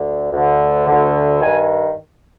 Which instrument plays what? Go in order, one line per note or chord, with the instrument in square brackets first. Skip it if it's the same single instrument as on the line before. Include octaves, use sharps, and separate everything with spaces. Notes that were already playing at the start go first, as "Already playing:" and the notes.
Already playing: [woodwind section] D2 D3
D2 D3
D2 D3
G2 D#3 G#5